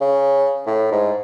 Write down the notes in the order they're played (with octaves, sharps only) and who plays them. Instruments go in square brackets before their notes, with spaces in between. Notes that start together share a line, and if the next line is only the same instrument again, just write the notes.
[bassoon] C#3
A2
G#2